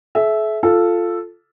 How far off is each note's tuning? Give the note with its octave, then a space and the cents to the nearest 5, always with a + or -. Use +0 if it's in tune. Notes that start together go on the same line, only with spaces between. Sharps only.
A4 -45 E5 -5
F4 +0 A4 +0